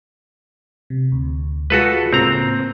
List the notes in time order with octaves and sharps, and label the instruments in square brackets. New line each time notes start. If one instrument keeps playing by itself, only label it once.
[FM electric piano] C3
D2
[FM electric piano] G#3 F4 G#4 [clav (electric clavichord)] F#4 A4 B4
[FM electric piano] A2 C#3 A#3 [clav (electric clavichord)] C4 A#5